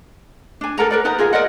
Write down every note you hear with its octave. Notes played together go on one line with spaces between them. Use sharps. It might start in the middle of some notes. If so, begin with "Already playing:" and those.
D4 G#5
A4 A#4 F#5 A#5
A#4 B4 D5
D#4 B4 F#5 A#5
F4 G#4 A#4 F5
A#4 D5 D#5 F#5